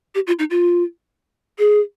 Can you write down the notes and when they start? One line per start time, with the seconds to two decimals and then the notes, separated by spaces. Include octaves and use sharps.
0.15 G4
0.27 F4
0.39 D#4
0.51 F4
1.59 G#4